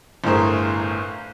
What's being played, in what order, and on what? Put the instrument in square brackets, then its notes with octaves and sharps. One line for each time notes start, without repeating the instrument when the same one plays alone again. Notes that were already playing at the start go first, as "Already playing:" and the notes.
[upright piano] G1 A2 G#4 A#4 C5